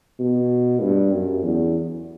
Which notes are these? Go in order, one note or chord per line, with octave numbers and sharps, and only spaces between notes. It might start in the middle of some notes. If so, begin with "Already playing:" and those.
B2
G2
F#2
E2